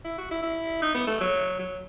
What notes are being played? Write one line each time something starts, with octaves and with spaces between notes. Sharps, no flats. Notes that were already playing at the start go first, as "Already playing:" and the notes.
E4
F#4
E4
E4
D#4
B3
A3
F#3
F#3